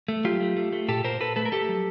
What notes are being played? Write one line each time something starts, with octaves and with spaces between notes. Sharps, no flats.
A3
F#3 F4 G4
A3
A3
A3
A#2 G4 A4
A#2 A#4 C5
A#2 A4 B4
A3 A4 B4
A#4
A3 G4 A4
F#3